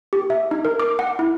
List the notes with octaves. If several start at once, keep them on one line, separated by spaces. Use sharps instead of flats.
G4
E5
D#4
A#4
D6
F#5
E4